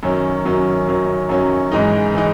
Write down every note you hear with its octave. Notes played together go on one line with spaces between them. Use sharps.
F#2 D#3 F#3 C#4
F#2 D#3 F#3 C#4
F#2 D#3 F#3 C#4
F#2 D#3 F#3 C#4
G#2 E3 G#3 D#4
E3 G#3 D#4